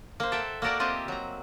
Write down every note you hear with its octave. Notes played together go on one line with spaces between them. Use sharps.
A#3 C5
A4 E5 F#5 G5
A#3 F#4 A4 A#4 D5 F#5
A#3 C4 F4 G4 D#5 E5
F#3 A#5